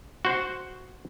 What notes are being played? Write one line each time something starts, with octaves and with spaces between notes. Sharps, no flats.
F#4 C5